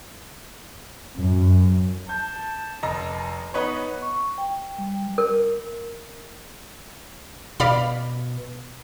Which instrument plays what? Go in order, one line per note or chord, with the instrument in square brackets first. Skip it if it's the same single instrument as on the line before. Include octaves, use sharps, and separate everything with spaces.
[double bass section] F#2
[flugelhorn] A5 [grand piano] G6
[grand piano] F1 D#5 A#5
[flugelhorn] B3 [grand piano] D#4 B4 C#5
[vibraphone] C#6
G5
G3
[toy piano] A#4
[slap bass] B2 [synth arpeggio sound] D5 F5 B5